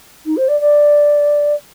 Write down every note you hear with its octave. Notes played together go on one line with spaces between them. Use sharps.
D#4
C5
D5
D5